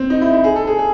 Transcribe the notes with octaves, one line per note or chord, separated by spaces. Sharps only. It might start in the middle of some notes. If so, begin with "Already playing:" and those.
Already playing: C4
D#4
E4
E4
G#4
A4
G#4
G#4